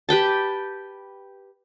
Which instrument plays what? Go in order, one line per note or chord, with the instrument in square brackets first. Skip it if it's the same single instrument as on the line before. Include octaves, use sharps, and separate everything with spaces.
[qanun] G4 B4 G5 A5